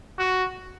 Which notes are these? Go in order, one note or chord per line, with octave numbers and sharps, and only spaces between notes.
F#4